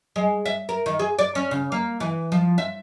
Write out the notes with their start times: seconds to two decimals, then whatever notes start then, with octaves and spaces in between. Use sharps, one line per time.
0.16 G#3
0.46 E5
0.69 A#4
0.86 D#3
0.99 G#4
1.19 D5
1.35 C#4
1.51 C#3
1.72 A#3
2.00 E3
2.32 F3
2.58 E5